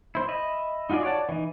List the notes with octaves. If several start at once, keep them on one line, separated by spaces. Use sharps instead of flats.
E4 C5
D#5 E5 B5
D#4 F4 F#4 G#4 D5
C#5 D5 F#5 A5
E3 D#4